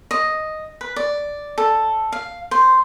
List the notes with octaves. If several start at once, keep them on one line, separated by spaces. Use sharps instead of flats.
D#5
B4
D5
A4
F5
C5